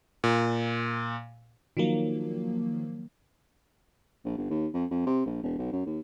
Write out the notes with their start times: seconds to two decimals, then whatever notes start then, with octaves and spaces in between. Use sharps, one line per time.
0.24 A#2
1.77 D#3 F3 F#3 A#3
4.25 A#1
4.37 G1
4.50 D#2
4.74 F2
4.91 F2
5.06 C3
5.26 A#1
5.43 E1
5.58 B1
5.72 F#2
5.86 D#2